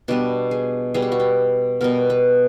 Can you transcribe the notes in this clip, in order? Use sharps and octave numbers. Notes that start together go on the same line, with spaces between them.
B2 G3 B3 D4
G#4
B2 G3 B3 G#4
G4
F#4
G4
B2 G3 B3 A#4
B4